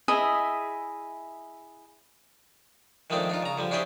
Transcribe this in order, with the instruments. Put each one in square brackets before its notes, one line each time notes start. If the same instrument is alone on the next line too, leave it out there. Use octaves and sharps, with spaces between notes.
[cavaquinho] E4 G#4 D#5 E5
[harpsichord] D#3 F3 G#3 A3 C4 D4
D4 D#4 F4
C#3 A#5
D3 F3 G3
C#4 D4 E4 G4 G#4 C5